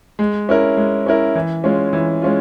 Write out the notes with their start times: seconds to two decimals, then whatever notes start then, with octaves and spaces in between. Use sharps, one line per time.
0.19 G#3
0.49 C#4 E4 A#4
0.77 G#3
1.06 C#4 E4 A#4
1.35 E3
1.64 G#3 C#4 F4
1.93 E3
2.22 G#3 C#4 F4